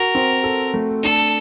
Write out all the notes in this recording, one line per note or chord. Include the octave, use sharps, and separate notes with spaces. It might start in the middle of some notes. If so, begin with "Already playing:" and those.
Already playing: F#4 A#4
C4
A4
A3
D4 A4